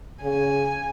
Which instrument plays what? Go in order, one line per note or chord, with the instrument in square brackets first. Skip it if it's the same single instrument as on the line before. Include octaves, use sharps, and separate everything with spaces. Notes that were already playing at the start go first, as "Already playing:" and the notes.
[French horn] C#3 [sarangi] G#5